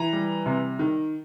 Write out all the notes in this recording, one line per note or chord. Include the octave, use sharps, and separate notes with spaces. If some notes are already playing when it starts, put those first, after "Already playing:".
Already playing: E3 A#5
G3
C3
D#3